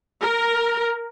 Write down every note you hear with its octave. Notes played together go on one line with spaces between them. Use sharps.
A#4